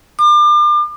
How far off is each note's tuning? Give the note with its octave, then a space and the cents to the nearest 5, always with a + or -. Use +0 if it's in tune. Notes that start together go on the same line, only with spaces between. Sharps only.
D6 +35